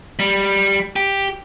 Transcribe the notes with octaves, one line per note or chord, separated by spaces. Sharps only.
G3
G4